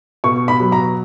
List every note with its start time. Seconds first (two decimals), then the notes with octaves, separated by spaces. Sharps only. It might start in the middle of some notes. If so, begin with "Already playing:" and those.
0.24 B2 C#6
0.48 B5
0.60 F#3
0.72 A#5